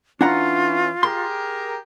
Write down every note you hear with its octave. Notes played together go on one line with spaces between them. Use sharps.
E3 C#4 D4 F4 F#5 A#5
G4 G#4 A#4 C6